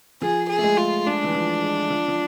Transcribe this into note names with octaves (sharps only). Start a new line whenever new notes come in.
F3 G#4
G#4
A3
G#3
F4
G#3 D4
E3
F3
G#3
F3
F3